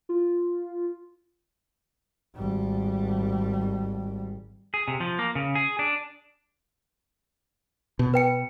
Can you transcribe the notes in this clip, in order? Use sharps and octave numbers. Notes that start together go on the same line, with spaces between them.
F4
G#1 G3
G#4
C3
F3
A#3
C#3
G#4
D4
B2
B4 G5 C#7